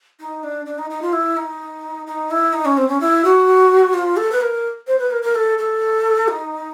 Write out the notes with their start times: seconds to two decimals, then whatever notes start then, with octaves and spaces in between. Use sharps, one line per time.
0.20 D#4
0.43 D4
0.66 D4
0.78 D#4
0.90 D#4
1.02 F4
1.13 E4
1.37 D#4
2.07 D#4
2.31 E4
2.53 D#4
2.65 C#4
2.77 C4
2.88 C#4
3.00 E4
3.24 F#4
3.94 F4
4.17 A4
4.32 B4
4.41 A#4
4.87 C5
4.99 B4
5.11 A#4
5.23 A#4
5.35 A4
5.58 A4
6.28 D#4